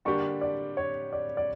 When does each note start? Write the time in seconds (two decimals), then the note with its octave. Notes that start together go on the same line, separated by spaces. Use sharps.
0.05 D3 G3 A#3 D4 G4 C#6
0.41 D5
0.77 C#5
1.13 D5
1.37 D5